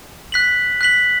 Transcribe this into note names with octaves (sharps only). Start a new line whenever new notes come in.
F#6 B6 F#7
F#6 B6 F#7